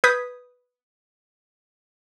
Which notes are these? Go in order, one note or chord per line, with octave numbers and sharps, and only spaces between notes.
B4 D#6 G6 G#6 B6